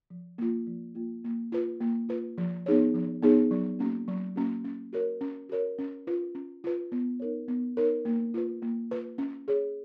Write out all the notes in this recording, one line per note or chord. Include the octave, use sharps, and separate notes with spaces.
F3
A#3 F4
F3
A#3 F4
A#3
F4 B4
A#3
F4 B4
F3
B3 D#4 G#4 C#5
F3
B3 D#4 G#4 C#5
F#3
A#3 C#4 F#4
F#3
A#3 C#4 F#4
C#4
F#4 A#4 C#5
C#4
F#4 A#4 C#5
C#4
F4 B4
C#4
F4 B4
B3
D#4 A#4 C#5
B3
D#4 A#4 C#5
A#3
F4 B4
A#3
F4 B4
C#4
G#4 C#5